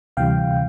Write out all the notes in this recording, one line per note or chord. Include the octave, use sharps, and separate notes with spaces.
D2 C3 E3 G3 F5 G5